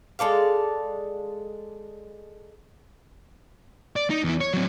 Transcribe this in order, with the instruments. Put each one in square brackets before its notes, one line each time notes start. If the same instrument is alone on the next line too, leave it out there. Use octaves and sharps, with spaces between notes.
[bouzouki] G#3 A4 D5 F5
[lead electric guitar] D5
D#4
E2 E4
C#5
F#3 C4